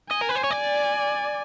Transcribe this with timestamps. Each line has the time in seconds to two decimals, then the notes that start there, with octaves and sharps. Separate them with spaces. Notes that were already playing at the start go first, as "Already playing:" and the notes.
0.11 D#5 G#5
0.22 A#4
0.29 B4
0.36 C5
0.44 C#5
0.51 D5